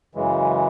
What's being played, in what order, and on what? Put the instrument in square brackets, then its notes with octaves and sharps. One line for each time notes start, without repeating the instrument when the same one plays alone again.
[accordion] F#2 C#3 E3 G#3